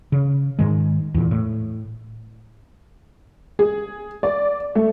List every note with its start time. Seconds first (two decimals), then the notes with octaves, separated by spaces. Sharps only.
0.12 C#3
0.59 G#2 D#3 G#3
1.14 E2 A#2
1.31 A2
3.59 G#4
4.23 D5
4.75 A3